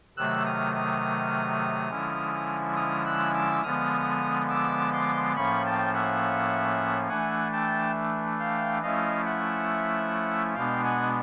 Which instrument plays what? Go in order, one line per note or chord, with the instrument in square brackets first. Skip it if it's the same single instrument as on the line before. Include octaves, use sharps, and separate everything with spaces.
[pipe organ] C3 D#3 F#3 A3 E6 F#6
D#6 F6
D#6 F6
D3 F3 G#3 C#4 E4
D#6 F6
E6 F#6
D6 E6
D3 F3 G#3 B3 D#6 F6
D6 E6
C6 D6
A2 F3 A#3 C#4 B5 C#6
G5 A5
E5 F#5
E3 A3 D4 F#5 G#5
G5 A5
F5 G5
F3 A3 C#4 E4 D#5 F5
E5 F#5
B2 G#3 B3 D4 F5 G5
F#5 G#5